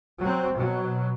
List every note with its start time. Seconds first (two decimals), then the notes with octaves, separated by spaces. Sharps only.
0.20 F#3 C4
0.53 B2 F#3